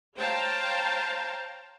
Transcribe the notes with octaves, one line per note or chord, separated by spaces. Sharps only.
C5 C#5 F5 G5 A5 A#5